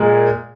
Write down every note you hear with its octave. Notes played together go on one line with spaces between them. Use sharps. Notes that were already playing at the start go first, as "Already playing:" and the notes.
Already playing: A#2 G#3